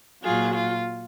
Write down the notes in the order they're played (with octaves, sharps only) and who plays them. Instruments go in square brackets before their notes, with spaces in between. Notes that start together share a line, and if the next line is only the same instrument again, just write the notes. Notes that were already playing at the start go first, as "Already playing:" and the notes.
[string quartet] A#2 F#3 F4 G#4
F4